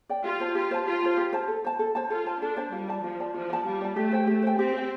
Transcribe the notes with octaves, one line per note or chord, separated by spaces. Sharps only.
D5 G5
F4 G4
C5 A5
F4 G4
C5 A5
F4 G4
C5 A5
G4
C5 A5
A4
C5 A5
A4
C5 A5
F4 A4
C5 A5
D4 A4
C5 A5
G3 F4
D5 A5
F3 F4
D5 A5
F3 F4
D5 A5
G3 F4
D5 A5
A3 G4
C5 G5
A3 G4
C5 G5
C4 G4
C5 G5